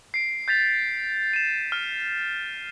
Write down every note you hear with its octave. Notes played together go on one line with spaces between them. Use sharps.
C7 D7
G6 A6 B6 F7
D#7 E7
F6